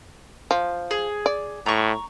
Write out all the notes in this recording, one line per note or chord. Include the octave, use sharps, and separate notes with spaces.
F3
G#4
D5
A2 A#5 C#6